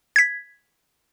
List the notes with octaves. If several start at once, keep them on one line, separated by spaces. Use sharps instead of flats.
G#6 B6